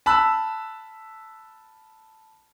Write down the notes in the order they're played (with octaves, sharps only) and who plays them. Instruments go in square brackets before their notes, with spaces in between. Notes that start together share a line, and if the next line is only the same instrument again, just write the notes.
[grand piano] A5 B5 E6 F#6